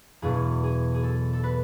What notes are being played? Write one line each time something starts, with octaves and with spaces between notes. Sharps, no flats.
E1 E2 B2 F#3 G#4
G#4
G#4
A4
A4
B4